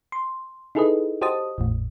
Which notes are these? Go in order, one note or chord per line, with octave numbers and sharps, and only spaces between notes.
C6
D#4 E4 G#4 A4 B4 D#5
F#4 G4 C5 D#5 A5 D#6
G#1 E2 A2